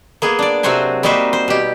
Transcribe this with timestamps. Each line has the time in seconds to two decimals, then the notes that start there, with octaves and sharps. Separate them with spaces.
0.22 A#3 B3 G#4
0.39 D4 D5
0.63 C3 F#3 C4 F#4 C5 G#5
1.03 G3 A#3 D#4 F#4 C5 E5
1.33 C5
1.48 B2 G4